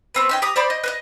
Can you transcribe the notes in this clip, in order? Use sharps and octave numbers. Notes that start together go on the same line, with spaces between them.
B3 C4 B4
C#4 D#4 G5
G4 A#5 D#6
C5 D5 B5 D6
D#5
B4 C5 D#5